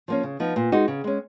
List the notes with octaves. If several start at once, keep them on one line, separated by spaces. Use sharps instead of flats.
F3 A#3 C#4
C#3
F3 B3 D#4
A#2
G#3 D#4 F#4
C#3
G#3 C#4